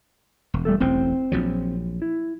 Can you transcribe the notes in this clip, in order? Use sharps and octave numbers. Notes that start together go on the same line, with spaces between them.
E1
G3 A3 A4
E1 A1 A2 C4 C5 G5
A#1 F3 F#3
E4